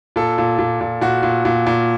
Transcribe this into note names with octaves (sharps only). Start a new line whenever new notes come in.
A#2 A4
A#2
A#2
A#2
A#2 F#4
A#2
A#2
A#2